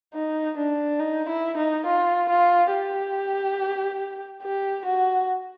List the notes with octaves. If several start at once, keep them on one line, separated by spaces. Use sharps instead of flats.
D#4
D4
D#4
E4
D#4
F4
F4
G4
G4
F#4